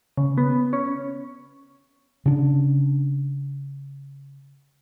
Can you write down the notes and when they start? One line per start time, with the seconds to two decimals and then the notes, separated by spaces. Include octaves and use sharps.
0.17 C#3
0.38 B3
0.73 C#4
2.26 C#3 D4